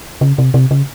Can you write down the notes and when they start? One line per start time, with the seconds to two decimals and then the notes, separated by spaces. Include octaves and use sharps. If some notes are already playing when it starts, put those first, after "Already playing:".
0.21 C#3
0.38 C3
0.54 C3
0.71 C#3